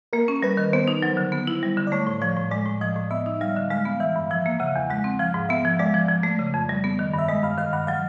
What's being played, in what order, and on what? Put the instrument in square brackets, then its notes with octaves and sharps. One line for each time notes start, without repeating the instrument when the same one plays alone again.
[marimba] A#3 [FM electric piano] A#4
[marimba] C#4
[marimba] G3 [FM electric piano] B4
[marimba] D#3
[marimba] B3 [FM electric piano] C5
[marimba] D#4
F#3
D3
B3
E4
G3
D3
[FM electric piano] D5
[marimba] A3 [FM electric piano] C#5
[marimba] A2
[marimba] F3 [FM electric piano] C#5
[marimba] A2
[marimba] G#3 [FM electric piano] D5
[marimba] A2
[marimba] F3 [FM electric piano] D#5
[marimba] A2
[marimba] B3 [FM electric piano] E5
[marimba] D#4
[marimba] G3 [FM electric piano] F5
[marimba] D3
[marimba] G#3 [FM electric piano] F5
[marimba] B3
[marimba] E3 [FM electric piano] E5
[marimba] G2
[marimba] F3 [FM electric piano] E5
[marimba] A#3
[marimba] C#3 [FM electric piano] F#5
[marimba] E2
[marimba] G#3 [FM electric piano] F#5
[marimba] C4
[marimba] F3 [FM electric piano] F5
[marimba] G#2
[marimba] B3 [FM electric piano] E5
[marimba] F3
[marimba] G#3 [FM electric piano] D5
[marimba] F3
F3
A3
C#3
F2
G3
B3
D#3
[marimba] G2 [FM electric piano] E5
[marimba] G#3 [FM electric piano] D#5
[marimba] G2 [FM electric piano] F5
[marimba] D#3 [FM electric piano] F5
[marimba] G2 [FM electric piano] F#5
[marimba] F#3 [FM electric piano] F5